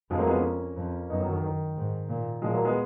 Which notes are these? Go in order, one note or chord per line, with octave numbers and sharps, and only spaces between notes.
F2 F3 G#3
F#3 A#3
G#3 B3
A#3 C#4
F2
F#2 B3 D#4
D#3 F#3
D#3
D#3
G#2
A#2
A#2 F3 G#3
F#3 A#3
G#3 B3